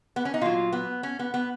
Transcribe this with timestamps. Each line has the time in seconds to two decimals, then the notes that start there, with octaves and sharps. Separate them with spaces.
0.16 B3
0.25 C#4
0.34 D#4
0.41 A#2 F#3 F4
0.72 B3
1.03 C#4
1.19 B3
1.34 B3